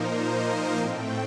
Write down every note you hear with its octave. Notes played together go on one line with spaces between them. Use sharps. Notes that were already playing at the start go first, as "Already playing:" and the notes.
Already playing: A#2 F3 A#3 D#4 A#4 C5
D#5
F5
A2 A3 C4 G5